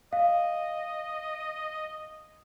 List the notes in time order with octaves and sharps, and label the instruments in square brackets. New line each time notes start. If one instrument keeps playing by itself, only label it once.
[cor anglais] D#5 [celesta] F5